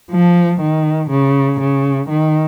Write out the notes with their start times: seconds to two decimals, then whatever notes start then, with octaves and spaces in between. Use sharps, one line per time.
0.11 F3
0.60 D#3
1.10 C#3
1.60 C#3
2.09 D#3